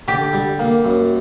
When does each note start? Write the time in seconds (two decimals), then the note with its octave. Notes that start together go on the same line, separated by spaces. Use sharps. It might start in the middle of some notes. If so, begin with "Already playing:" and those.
0.08 D3 G4
0.33 G3
0.59 A#3
0.85 F#2